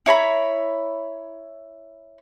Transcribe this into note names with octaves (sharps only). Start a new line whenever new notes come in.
E4 C#5 A#5 B5